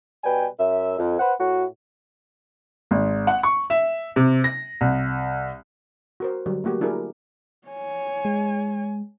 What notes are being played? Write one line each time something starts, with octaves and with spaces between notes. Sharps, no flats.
B2 G3 B4 G5 G#5
F#2 E5
F2
B4 C5 F#5
A2 F#4
G#1
F#5
C#6
E5
C3
A#6
C2
F#4 A#4 C5
D3 F#3 G3
A3 A#3 F#4 G4
F#3 D4 E4 G4 G#4 A#4
C#5 G#5
G#3